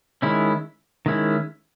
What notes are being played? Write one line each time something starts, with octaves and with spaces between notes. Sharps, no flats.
D#3 G#3 C#4 E4
D#3 G#3 C#4 E4